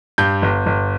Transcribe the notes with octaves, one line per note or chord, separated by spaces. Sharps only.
G2 G6
G1
G1